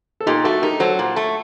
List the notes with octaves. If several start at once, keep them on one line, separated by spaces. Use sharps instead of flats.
A4
A#2 D#4 G4
A3 F#4 A4
D#4 G4 A#4
F#3 A4 C5
A#2
A3